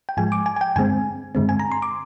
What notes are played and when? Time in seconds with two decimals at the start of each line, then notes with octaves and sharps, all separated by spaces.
0.09 G5
0.17 G#2 F3 G#3 G#5
0.32 D6
0.46 G#5
0.56 G#5
0.61 G5
0.76 G2 D3 G#3 C4 G#5
1.35 G2 D3 G#3 C4
1.49 G#5
1.60 A#5
1.72 C6
1.82 D6